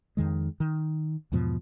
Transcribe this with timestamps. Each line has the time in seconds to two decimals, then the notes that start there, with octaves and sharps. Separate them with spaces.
0.17 F2 D#3 G#3
0.60 D#3
1.32 E2 G#2 B2 F3